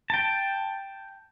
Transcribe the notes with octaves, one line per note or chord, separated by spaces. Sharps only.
G5 A5